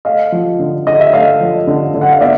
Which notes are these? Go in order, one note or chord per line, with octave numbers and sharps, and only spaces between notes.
A3 D#5 F5
F3
D3
D3 D#5
E5
A3 D#5 F5
F3
D3
D3
F#5
F5
B3 D5 E5